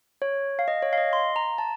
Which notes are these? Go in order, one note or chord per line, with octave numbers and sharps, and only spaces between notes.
C#5
F5
D#5
C#5
F5
D#5
C6
A#5
A5